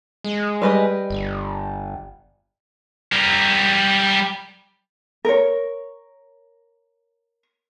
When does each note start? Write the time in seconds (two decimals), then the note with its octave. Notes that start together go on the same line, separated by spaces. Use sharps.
0.24 G#3
0.62 G3 B4 D#5
1.10 G1
3.12 G3 A#4
5.25 A#4 C#5